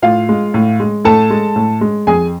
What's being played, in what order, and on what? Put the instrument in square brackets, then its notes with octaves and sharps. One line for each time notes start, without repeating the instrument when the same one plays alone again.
[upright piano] A2 F4 F5
G#3
A2
G#3
A2 A4 A5
G#3
A2
G#3
F2 G#4 G#5